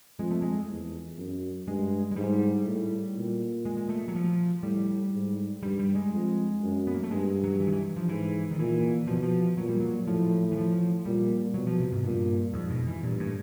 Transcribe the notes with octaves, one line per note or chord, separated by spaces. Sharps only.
F2 G#3
A3
G#3
E2
F#2
G2 G#3
G#3
G#2 G3
A2
A#2
G#3
G#3
A3
F#3
F3
A2 G3
G#2
G2 G3
G3
G#3
F2
F#2
B3
A#3
A3
G2 G#3
F#3
E3
D#3
E3
F3
G#2 E3
D#3
A#2 E3
B2 F3
E3
F3
A#2 F#3
G3
F#3
A2 F3
E3
F3
A#2 G3
B2 F#3
F3
C3
G#2
G2 A#2
F2 G#2
B2
E3
G2 A#2
A2